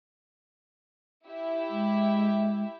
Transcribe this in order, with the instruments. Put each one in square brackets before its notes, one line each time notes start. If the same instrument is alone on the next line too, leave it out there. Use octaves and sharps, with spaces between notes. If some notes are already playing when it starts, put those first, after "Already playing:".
[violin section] E4 G4 E5
[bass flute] G#3